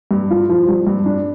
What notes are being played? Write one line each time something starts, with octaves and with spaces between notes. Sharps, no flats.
G2
F4
F3
G3
G2
D4